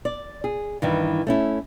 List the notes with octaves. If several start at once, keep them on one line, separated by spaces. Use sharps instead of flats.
D5
G#4
G2 D#3 E3
A3 C#4 E4